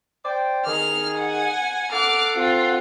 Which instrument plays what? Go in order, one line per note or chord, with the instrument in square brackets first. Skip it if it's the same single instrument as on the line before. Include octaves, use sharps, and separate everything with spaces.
[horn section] C5 D5 G5
[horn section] D#3 G#4 [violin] F6
[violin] F#5 G#5
[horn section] A4 F5 F#5 [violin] D6 F6
[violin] C4 F4